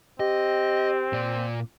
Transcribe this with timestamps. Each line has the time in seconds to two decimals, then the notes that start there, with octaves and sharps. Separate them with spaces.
0.20 C4 G4 D#5
1.13 A#2 D5